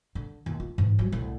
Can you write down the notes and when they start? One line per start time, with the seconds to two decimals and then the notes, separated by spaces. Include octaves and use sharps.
0.15 D3
0.46 D#2
0.60 F4
0.78 G#2 E3
0.99 F#3 G3
1.12 C2 A2